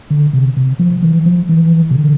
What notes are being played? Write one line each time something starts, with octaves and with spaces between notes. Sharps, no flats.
D3
C3
C3
F3
E3
F3
E3
C3
D3